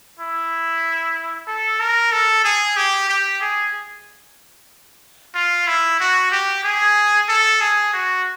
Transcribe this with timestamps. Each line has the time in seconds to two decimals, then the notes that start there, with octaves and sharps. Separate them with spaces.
0.19 E4
1.47 A4
1.80 A#4
2.12 A4
2.44 G#4
2.76 G4
3.09 G4
3.41 G#4
5.35 F4
5.67 E4
6.00 F#4
6.31 G4
6.64 G#4
7.29 A4
7.60 G#4
7.93 F#4